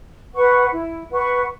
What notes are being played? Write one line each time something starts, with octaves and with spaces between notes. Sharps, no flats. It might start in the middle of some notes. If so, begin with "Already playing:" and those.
B4 F#5 C#6
E4
B4 F#5 C#6